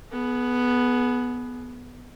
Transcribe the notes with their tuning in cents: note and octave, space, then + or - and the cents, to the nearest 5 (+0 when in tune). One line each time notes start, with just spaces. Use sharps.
B3 +0 G#4 +40